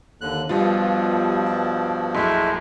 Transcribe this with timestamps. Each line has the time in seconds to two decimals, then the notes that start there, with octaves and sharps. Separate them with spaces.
0.21 D#2 D3 F#6
0.49 G2 B2 F3 G3 B3 F4
1.46 A5
2.14 A#1 F#2 G#3 A3 E4